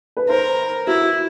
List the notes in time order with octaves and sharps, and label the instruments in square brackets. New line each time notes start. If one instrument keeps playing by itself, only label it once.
[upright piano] B4
[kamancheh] A#4 [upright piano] C5
[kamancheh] E4 [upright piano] F#4